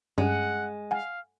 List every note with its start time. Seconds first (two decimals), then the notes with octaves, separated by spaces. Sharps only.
0.18 G2 G#3 C#4 F#5
0.91 F5 F#5 G#5